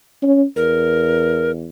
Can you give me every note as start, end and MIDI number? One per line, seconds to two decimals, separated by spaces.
0.22 0.44 61
0.56 1.68 40
0.56 1.51 70